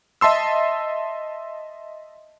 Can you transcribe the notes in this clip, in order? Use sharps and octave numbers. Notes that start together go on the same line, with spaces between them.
D#5 E5 A5 C6 E6